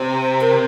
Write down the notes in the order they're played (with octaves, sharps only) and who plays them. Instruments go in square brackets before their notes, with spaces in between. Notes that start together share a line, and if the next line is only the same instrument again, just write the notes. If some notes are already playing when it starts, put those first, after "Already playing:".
Already playing: [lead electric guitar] C3 [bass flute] C5
[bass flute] A#4